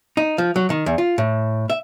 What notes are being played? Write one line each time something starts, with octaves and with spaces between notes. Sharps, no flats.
D#4
F3
F#3
D#3
E2
F4
A2
E5